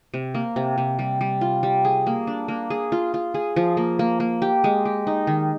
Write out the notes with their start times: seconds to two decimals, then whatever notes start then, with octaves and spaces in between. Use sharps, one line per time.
0.14 C3
0.34 A#3
0.56 C3
0.78 C3
0.99 G3
1.21 G3
1.41 F4
1.63 G3
1.85 G#4
2.06 A#3
2.27 D4
2.48 A#3
2.70 G#4
2.92 F4
3.14 F4
3.34 G#4
3.56 F3
3.77 A#3
3.99 A#3
4.20 A#3
4.42 G4
4.64 G#3
4.85 G4
5.07 D#4
5.27 D#3